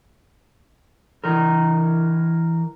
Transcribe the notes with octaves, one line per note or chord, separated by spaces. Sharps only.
E3 A#4